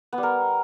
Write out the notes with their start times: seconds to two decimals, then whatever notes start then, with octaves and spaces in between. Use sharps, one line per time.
0.13 B3
0.18 G3
0.23 A#4